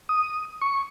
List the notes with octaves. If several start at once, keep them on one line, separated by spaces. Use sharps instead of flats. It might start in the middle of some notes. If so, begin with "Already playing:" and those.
D#6
C#6